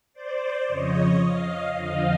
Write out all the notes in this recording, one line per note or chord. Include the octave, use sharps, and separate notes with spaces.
C5 D5
F2 C#3 F3 C#5 D#5
D#5 F5
F2 D3 F3 D#5 F5